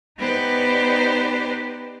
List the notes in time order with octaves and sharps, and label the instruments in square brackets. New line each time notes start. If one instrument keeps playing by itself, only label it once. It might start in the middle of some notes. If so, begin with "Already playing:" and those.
[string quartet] B3 D#4 G4 B4 C5 D5